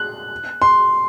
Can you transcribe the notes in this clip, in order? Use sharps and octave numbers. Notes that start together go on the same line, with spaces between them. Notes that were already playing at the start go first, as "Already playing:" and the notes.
Already playing: F#6
C6